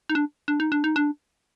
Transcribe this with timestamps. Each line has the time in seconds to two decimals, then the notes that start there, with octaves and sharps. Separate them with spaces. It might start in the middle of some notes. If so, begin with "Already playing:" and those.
0.09 D#4
0.15 D4
0.48 D4
0.60 D#4
0.72 D4
0.84 D#4
0.96 D4